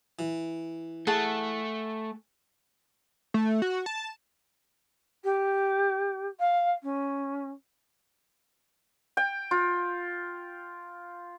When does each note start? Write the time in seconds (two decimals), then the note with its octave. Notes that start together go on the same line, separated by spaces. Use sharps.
0.19 E3
1.07 A3 G#4 F#5 A5
3.34 A3
3.62 F#4
3.86 A5
5.24 G4
6.40 F5
6.83 C#4
9.17 G5
9.51 F4